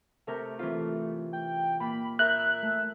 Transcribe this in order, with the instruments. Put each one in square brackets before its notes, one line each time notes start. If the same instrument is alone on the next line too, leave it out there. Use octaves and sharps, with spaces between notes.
[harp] C3 A#4 G6 [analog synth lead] A3
[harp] E3 C4 F4
[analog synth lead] G5
[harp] A#2 [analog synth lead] B5
[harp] A#4 G6 [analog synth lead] E5 [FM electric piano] F#6
[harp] A3